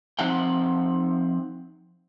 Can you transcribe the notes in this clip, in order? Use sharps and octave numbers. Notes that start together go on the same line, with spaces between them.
F3 C4 D#4 F#5 G5